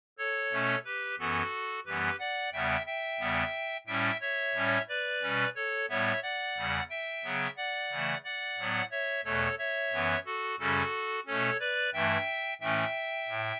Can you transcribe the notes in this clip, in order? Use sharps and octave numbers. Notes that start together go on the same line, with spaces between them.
A4 C#5
B2 A3 C#4
G4 B4
F#2 E3 B3 F#4 A4
F#2 E3 G3 B3 G4 B4
D5 F#5
E2 C#3 G3 B3 E5 G5
E5 G5
E2 C#3 G3 B3
A2 G3 C#4 E5 G5
C#5 E5
A2 G3 C#4
B4 D5
B2 G3 C#4
A4 C#5
A2 G3 B3 C#5 E5
D5 F#5
E2 C#3 G3
E5 G5
C#3 F#3 B3
D5 F#5
C#3 E3 A3
D5 F#5
A2 F#3 B3
C#5 E5
E2 B2 A3 A4 C#5
C#5 E5
F#2 E3 B3
F#4 A4
F#2 C#3 G3 C#4 F#4 A4
B2 A3 C#4 A4 C#5
B4 D5
G2 E3 A3 E5 G5
A2 E3 A3 C#4 E5 G5
A2